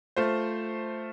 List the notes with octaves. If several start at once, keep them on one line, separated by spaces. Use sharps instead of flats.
A3 F4 C5